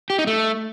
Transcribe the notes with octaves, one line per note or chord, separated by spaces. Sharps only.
G4
D#4
A3